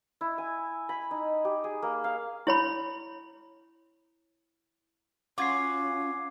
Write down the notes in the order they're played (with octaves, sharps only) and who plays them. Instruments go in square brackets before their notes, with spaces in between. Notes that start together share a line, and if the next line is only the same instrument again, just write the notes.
[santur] E4
G#5
B5
D#4
G4
G#4
A#3
F5
[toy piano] E4 C#5 B5
[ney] C#4 [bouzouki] F4 F#4 [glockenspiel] D6 G#6 C7